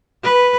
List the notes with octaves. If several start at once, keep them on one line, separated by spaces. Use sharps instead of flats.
B4